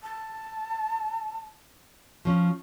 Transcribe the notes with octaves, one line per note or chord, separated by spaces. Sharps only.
A5
F3 C#4 C#6